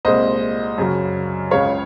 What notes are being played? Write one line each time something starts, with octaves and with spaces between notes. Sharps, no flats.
C2 A#2 G#3 C5 D#5
F#2 C#3 F#3
C#2 C#3 G#3 C#5 F5